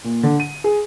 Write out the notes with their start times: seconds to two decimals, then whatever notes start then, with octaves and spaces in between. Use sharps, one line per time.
0.04 A#2
0.23 D3
0.40 D#7
0.64 G#4